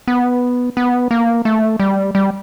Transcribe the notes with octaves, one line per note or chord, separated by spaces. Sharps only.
B3
B3
A#3
A3
G3
G3